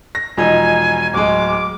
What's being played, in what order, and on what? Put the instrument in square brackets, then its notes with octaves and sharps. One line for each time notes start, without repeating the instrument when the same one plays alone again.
[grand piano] A#6
[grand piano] E1 F3 D#4 [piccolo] G#5
[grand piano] D1 G#3 [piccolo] D6